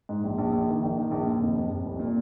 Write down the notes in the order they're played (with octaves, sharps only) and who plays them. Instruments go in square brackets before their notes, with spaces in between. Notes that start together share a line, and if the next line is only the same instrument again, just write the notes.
[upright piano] G#2
A#1
A#1
A#1
D#3
A#1
D#3
A#1
D#2
F1
F1
F1
C2
A#2